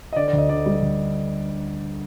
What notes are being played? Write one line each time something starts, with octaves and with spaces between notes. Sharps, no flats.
D#5
D3 D5
D5
D2
D#5
D3 D5
G3
D2